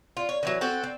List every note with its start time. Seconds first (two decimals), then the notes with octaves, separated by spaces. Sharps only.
0.17 F4
0.29 C#5
0.43 D#3 E3 F#3
0.61 C4 F#4 A4
0.83 C4